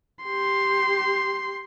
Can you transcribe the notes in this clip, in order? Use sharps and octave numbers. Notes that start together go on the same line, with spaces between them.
G4 C6